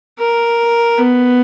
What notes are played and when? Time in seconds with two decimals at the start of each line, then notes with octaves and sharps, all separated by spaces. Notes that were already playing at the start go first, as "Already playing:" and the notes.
0.18 A#4
0.98 B3